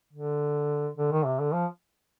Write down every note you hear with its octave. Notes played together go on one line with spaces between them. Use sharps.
D3
D3
D#3
C3
D3
F3